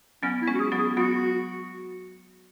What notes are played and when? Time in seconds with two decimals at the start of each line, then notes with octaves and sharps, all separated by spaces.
0.23 F#3 B3 C#4
0.42 E4
0.48 G#3 C#4
0.55 F#4
0.60 G#4
0.72 F#3 B3
0.78 G#4
0.97 F#3 B3 F#4